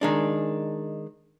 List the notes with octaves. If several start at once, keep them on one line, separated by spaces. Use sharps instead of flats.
D#3 G#3 D4